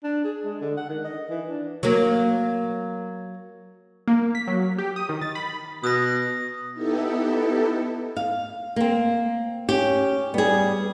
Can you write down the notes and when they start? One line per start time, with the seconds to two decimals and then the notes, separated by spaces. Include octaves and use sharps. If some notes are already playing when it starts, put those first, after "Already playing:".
0.04 D4
0.24 G#4
0.44 G#3
0.61 D3
0.77 F#5
0.89 D#3
1.04 D#5
1.30 E3
1.49 D4
1.83 F#3 A#3
4.08 A#3
4.35 B6
4.47 F#3
4.78 G4
4.96 D#6
5.09 D#3
5.22 A6
5.35 B5
5.84 B2 D#6 A#6
6.74 B3 D#4 E4 G4 A4
8.17 F5
8.76 A#3 C4
9.69 C#4 G4
10.34 G3 B3 G#4